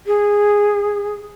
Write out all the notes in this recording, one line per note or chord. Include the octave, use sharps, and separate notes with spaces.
G#4